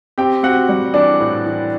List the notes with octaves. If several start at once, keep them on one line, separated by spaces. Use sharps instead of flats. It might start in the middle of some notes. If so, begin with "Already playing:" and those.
C4 G4 G5
C4 F#4 F#5
G3
E3 D4 D5
A2
E3